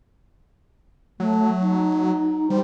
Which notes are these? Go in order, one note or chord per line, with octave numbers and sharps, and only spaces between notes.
F#3 A3
D#4
G3 C5